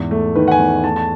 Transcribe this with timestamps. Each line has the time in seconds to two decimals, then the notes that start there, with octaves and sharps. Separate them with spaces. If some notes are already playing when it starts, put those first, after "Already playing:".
Already playing: E2 G#2
0.11 A3
0.36 D#3 B4
0.48 F#5
0.51 G#5
0.59 E2
0.84 A3 A5
0.96 A5